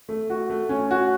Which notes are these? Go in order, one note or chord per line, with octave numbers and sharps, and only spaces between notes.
A3
F#4
A3
C#4
F#4